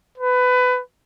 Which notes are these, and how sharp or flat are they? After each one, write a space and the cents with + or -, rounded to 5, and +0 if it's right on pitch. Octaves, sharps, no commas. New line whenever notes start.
B4 +20